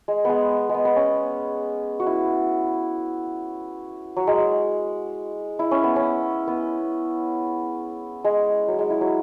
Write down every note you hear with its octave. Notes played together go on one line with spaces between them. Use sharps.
G#3
G#3 B3
G#3
B3
B3
C#4
F#4
E4
F#3
G#3
E4
C#4
B3
C#4
B3
G#3
F#3
G#3
E4
F#3